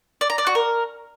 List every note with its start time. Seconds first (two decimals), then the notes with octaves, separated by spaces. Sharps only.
0.21 D5
0.30 A#5
0.38 D5
0.47 F#4
0.55 A#4